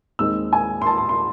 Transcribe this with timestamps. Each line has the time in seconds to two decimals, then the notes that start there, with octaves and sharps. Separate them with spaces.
0.19 D#2 D#3 G#3 C4 D#4 E6
0.53 G#5
0.82 C6
0.86 A5
0.98 C6
1.09 C6